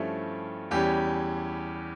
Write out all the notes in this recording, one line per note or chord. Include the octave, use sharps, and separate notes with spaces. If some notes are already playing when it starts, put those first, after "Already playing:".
Already playing: G2 F3 A3 C#4 E4
E2 E3 G3 C#4 G4